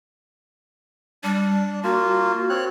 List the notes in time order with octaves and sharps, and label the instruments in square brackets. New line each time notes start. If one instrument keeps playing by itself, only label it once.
[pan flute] G3 [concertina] D4
[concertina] A#3 F4 [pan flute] F#4
[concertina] C4 C#5 F#6